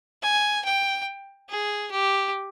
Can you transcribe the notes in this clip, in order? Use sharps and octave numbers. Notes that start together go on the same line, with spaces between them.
G#5
G5
G#4
G4